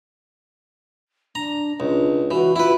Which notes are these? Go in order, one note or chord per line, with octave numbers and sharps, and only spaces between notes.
D4 A#5
C#2 D4
E3 F#4
E4 F4 B4